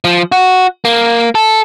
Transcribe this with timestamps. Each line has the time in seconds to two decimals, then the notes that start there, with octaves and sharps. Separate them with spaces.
0.04 F3
0.32 F#4
0.85 A#3
1.35 A4